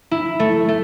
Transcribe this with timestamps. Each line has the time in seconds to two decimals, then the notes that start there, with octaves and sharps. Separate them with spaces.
0.11 E4
0.40 A3
0.69 A3